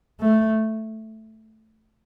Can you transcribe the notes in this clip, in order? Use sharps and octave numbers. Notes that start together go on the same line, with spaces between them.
A3